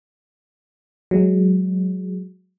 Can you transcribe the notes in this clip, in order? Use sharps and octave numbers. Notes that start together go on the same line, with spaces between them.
F#3 G#3